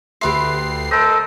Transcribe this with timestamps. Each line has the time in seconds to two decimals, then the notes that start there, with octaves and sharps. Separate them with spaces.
0.21 D2 G4 B4 E5 C6 C7
0.91 A4 A#4 C5 D#5